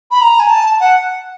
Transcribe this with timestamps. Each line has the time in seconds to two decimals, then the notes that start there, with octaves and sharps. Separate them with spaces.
0.11 B5
0.21 A#5
0.40 G#5
0.50 A5
0.80 F#5